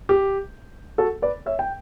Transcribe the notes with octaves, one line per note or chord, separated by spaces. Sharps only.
G4
F#4 A4
B4 D5
C#5 E5
G5